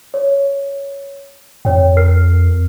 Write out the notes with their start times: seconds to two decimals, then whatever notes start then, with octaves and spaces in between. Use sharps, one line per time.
0.14 C#5
1.65 F2 C#5 G5
1.97 A#4 F6 C7